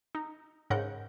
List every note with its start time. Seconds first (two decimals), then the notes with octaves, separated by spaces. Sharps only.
0.15 D#4
0.70 G#2 C#3 A#4 F#5 G6